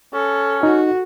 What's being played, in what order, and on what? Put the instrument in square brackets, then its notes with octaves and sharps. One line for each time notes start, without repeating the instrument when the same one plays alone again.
[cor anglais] C#4 [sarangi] A4
[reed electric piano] D#4 [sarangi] F#4